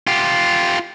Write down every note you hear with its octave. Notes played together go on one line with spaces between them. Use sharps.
F4 G4